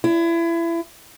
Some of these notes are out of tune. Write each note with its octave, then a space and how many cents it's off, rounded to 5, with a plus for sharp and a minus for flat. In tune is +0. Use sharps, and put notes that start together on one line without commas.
E4 +30